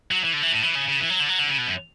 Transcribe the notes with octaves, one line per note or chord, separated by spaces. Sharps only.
F#3
E3
D3
E3
A2
E3
C#3
C#3
E3
F#3
D3
F#3
D3
C#3
B2
F#2